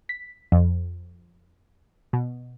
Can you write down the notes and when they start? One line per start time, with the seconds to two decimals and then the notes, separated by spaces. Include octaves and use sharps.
0.09 B6
0.52 F2
2.13 B2